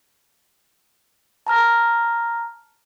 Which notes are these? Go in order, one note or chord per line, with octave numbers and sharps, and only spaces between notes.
A5 A#5 F6 A#6